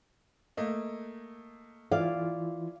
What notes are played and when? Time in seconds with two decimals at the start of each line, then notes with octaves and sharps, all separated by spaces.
0.57 A3 A#3 D#5
1.91 E3 E4 F4 D5 F5